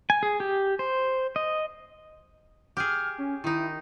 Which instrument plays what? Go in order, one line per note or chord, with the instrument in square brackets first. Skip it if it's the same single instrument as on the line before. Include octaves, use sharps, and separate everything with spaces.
[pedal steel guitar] G#5
G#4
G4
C5
D#5
[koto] G4 G#4 [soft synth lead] F6
[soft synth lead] C#4
[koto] D#3 D#4 [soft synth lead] E4